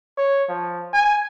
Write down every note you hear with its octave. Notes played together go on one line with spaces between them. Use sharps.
C#5
F3
G#5